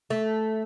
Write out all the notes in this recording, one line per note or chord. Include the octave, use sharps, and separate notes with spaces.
A3